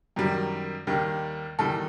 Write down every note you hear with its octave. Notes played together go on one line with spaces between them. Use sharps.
F#2 D#3 G3
D#2 D#3 G3
E2 D#3 G3 A4